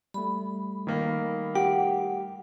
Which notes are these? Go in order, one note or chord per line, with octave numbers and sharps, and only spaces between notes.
G3 A3 B5
D#3 A#3
G4 F#5